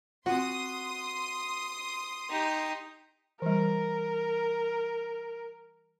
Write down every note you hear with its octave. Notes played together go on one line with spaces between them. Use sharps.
C4 F4 F#4 C6 D#6
D#4 G4
E3 G3 A#4